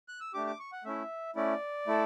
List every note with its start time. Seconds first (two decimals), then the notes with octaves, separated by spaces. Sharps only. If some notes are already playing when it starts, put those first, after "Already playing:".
0.08 F#6
0.21 E6
0.34 A3 D4 G4 D6
0.47 D6
0.59 C#6
0.72 F#5
0.84 A3 C#4 E4 E5
1.35 A3 C#4 E4 D5
1.87 A3 E4 A4